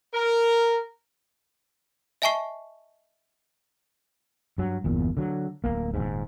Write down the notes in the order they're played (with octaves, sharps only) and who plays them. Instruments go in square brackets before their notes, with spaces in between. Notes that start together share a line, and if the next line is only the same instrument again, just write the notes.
[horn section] A#4
[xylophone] D#5 E5 G#5 A5 C#6 C7
[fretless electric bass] G2 F#3
G1 E2 A#2
D3 F#3
D1 C#2 A#3
D#1 G#2